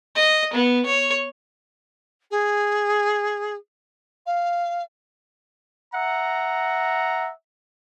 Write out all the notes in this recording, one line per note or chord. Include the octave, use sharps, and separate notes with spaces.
D#5
B3
C#5
G#4
F5
E5 F#5 A#5